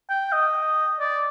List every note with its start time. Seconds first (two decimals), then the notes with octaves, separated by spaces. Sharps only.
0.10 G5
0.32 D#5
1.00 D5